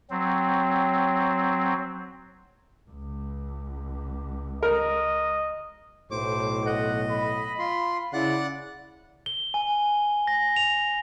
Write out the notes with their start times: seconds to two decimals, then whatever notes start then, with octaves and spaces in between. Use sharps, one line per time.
0.10 F#3 C4
2.90 C#2
4.63 A#4 D#5
6.11 B1 A2 C5 D6
6.66 D#5 F#5
7.10 B5
7.59 F4 C6
8.13 C#3 E4 D5 F#5 F#6
9.26 G7
9.54 G#5
10.27 A#6
10.56 F7